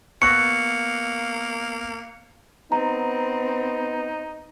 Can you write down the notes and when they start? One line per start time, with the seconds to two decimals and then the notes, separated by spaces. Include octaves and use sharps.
0.22 A#3 B3 C#6 E6 F#6 A6 A#6 C#7
2.72 B3 C4 D#4 A#5